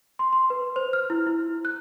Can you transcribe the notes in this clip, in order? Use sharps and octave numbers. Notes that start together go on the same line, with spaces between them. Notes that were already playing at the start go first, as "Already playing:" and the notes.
C6
C6
B4
C5
F6
E4
E4
F#6